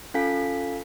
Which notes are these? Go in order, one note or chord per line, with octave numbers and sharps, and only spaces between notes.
C#4 F4 A4 F5 G#5 B6